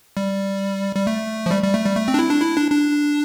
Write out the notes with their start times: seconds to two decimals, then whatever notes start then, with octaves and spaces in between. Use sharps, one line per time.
0.17 G3
0.96 G3
1.07 A3
1.46 F3
1.51 G3
1.63 G3
1.74 A3
1.85 G3
1.96 A3
2.08 C4
2.14 D4
2.19 E4
2.30 D4
2.42 E4
2.57 D4
2.71 D4